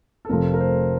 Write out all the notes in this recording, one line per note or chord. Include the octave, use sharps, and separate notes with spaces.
A4
F1 F2 C3 F3 A3 A#4
A#4
C5